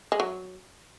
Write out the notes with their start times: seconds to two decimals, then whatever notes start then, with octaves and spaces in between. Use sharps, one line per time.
0.12 G#3
0.20 F#3